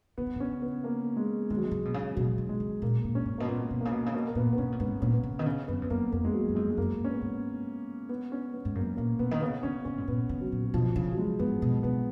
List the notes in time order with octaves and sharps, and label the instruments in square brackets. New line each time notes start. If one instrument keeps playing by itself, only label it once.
[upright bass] C#3 [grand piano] B3
[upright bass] D#3
[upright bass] C#3 [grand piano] C#4
[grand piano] B3
A#3
G#3
[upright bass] D#3 [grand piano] G#3
[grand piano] F#3
G#3
[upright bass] C#3
B2
C#3
[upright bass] B2 [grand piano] F#3
[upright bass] D#3
[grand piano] G#3
[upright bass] C#3
[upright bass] A#2 [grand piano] A#3
[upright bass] A#2
[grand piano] C#4
[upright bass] G#2
[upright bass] B2 [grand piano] A#3
[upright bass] A#2 [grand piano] B3
[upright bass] B2
[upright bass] C#3 [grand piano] A#3
[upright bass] B2
C#3
[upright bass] B2 [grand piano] A#3
[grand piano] A#3
[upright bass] A#2 [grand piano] B3
[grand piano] B3
[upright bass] B2 [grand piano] C#4
[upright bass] A#2
[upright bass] G#2 [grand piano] B3
[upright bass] A#2 [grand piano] C#4
[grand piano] B3
[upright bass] C#3
[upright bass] D#3 [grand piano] B3
[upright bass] C#3 [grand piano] C#4
[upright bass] F#2 [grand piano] B3
[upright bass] F2 [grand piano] B3
[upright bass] F#2 [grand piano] A#3
[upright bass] F2 [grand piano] A#3
[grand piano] G#3
F#3
[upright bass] F#2
[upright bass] F2 [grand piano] G#3
[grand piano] G#3
[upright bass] F#2 [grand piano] A#3
[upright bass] G#2 [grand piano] C#4
[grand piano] B3
[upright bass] G#2
[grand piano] B3
C#4
B3
[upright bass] G#2
[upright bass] F#2 [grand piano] A#3
[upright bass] A#2 [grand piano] A#3
[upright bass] B2 [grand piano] B3
[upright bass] D#3
[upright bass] C#3 [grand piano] B3
[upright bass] D#3 [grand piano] C#4
[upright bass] C#3 [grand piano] C#4
[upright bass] G#2
[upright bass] A#2 [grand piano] B3
[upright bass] C#3
[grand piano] F#3
[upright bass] A#2
[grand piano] F#3
[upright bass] B2 [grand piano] F3
[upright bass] C#3
[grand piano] F#3
G#3
[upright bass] G#2 [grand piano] B3
[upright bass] B2
[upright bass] B2 [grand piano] B3